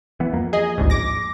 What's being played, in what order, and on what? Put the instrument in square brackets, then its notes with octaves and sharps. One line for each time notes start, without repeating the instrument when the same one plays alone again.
[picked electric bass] E3 B3
F2 A#3
[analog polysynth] G#4 D#5
A1 D2 G#2
D6 A#6